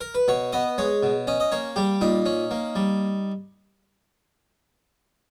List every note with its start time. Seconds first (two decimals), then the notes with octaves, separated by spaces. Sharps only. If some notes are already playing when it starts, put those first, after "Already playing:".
0.01 A#4
0.15 B4
0.28 B2 C#5
0.53 B3 D#5
0.78 G#3 C#5
1.03 B2
1.27 C#4 D#5
1.40 D#5
1.52 A#3 C#5
1.76 G3 G4
2.01 A#2 D#4
2.26 C#4
2.51 A#3
2.76 G3